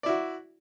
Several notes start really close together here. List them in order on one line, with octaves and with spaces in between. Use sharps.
D5 E4 F#4